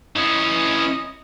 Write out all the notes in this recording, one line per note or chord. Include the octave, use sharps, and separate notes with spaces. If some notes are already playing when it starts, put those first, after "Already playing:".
E3 C#4 D#5